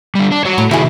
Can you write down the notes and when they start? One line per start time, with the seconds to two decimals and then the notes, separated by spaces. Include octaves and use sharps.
0.15 D3 G3
0.32 D4
0.45 F#4 C#5
0.58 A2
0.71 C3 D#3 E4 F#4 G#4